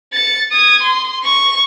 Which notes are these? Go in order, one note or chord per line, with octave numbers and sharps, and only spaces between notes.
A6 C#7
D#6 G#6
C6
C#6